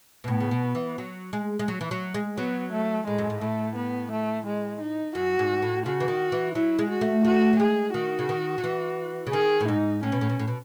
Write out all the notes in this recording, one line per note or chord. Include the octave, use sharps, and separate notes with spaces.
B2
A2 B3
C#3
B2
E3
F#3
G#3
G#3
F#3
E3
F#3
G#3
F#3 B3
A3
A2 G#3
F#2
G#2
A2 A3
B3
A3
G#3
D#4
F#2 F#4
G#2
A2
C#3 F#4
E3
D#3
E3
F#3 E4
G#3
F#4
A3
A3 F#4
F#3
G#3 G#4
D#3 F#4
C#3
D#3
F#3
E3
C#3
D#3 G#4
A2
G#2 D#4
A2 C#4
B2
A2
B2
A2
B2